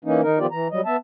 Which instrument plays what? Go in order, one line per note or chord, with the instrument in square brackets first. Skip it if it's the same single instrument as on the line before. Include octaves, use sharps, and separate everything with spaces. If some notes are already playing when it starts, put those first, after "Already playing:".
[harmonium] E3 A#3 C#4 D#4
D#3 D#4 A#4
D#3 F3 B3 F4 G4 D5
E3 A#5
F#3 G3 D#5
B3 E5 A5